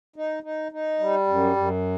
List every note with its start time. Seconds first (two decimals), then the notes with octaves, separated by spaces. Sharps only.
0.16 D#4
0.43 D#4
0.72 D#4
0.99 G3
1.27 F#2
1.56 F#2